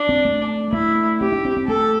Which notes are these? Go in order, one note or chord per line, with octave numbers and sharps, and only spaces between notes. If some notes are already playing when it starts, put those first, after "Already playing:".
Already playing: D4
C4
A3
A3 E4
C4 G4
D4
C4
C4
A3 A4